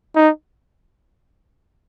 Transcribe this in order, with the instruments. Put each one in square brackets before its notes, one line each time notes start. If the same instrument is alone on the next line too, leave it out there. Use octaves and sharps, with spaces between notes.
[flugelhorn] D#4